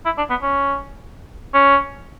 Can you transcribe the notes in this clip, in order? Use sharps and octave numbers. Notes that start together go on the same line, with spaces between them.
E4
D4
B3
C#4
C#4